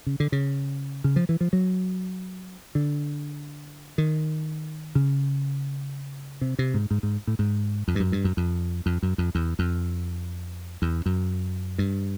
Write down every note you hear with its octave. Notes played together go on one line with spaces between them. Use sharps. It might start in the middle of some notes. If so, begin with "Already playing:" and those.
C#3
D3
C#3
C#3
F3
E3
F3
F#3
D3
D#3
C#3
C3
C3
G#2
G#2
G#2
A2
G#2
F2
G2
F#2
G2
F#2
F2
F2
F#2
F2
E2
F2
E2
F#2
G2